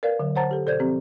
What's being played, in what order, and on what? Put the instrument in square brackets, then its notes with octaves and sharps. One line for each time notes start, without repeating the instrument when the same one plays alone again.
[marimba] A#4 B4 D5 F5
D3 F#3
C5 C#5 F#5 A5 A#5 A6
G4 A4
B2 A4 C5 D5 G6 G#6
F3 C4 G4